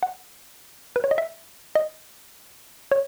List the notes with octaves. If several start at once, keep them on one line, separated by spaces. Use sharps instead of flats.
F#5
B4
C#5
D#5
E5
D#5
C#5